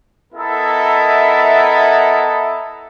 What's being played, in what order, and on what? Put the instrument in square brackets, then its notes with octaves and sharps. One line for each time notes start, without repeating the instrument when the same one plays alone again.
[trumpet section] B3 E4 A4 A#4 D#5 E5